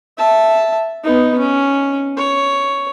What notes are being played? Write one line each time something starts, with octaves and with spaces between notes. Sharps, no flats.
E5 A5
B3 D#4
C#4
C#5